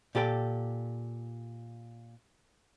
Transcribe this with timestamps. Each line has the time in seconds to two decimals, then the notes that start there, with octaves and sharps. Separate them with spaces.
0.15 A#2 G4 A4 A#4 G5